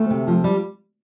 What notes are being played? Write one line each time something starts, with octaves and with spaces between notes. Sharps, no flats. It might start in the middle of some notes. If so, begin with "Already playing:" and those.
Already playing: D2 A3 A4
C3
F3
G3